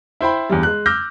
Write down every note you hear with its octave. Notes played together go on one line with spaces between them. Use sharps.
E4 C5 G5 B5
E2 G2 G3
G#3 F#6
D6 E6 F6 G6 A#6